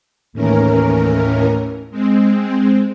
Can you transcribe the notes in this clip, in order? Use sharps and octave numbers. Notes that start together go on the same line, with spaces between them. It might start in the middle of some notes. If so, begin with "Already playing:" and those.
D#2 A2 E3 C#4 A#4
G#3 C4